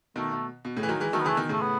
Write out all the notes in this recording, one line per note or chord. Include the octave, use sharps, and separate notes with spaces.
B2 D#3 A3
B2
B2
A2 C#3
E3
D#3 F#3
E3 G#3
D#3 F#3 A3
B3
C#3 E3 A3
B2 D#3
A2 C#3 A3
B3